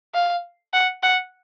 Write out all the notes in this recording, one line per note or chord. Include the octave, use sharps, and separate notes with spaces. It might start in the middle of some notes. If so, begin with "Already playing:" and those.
F5
F#5
F#5